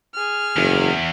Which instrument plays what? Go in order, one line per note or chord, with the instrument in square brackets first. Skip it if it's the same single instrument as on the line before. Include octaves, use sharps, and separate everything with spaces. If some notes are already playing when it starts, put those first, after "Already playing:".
[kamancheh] G#4 F6
[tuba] F#1 [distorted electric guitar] E2